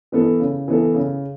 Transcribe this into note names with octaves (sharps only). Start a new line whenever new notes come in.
E3 B3 A4
C#3
E3 B3 A4
C#3